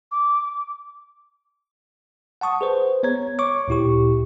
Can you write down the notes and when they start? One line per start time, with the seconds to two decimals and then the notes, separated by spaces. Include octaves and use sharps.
0.12 D6
2.41 F#5 A5 C#6 D#6
2.61 G#4 B4 C5
3.03 B3 C#5 A#5 G#6
3.39 C#5 C#6 D6
3.68 D2 A#2 E4 G4 C#6